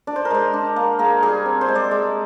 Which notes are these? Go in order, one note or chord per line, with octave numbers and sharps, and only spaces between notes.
D4 D5
C5
A#4
G#3 C5
D4
A#3
A#3 G#4
G3 G#4
C4
C5
G#3
D5
G#3